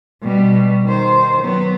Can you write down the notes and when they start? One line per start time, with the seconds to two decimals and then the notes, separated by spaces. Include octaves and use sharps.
0.23 B2 G3
0.85 D#3 C5
1.41 F#3 B3